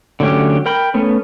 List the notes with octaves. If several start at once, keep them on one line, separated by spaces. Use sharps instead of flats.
D3 F#3 A3 C#4 G4
A#4 G5 B5
A3 B3 C#4